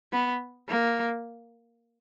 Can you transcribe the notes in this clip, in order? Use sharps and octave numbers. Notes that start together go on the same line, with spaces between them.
B3
A#3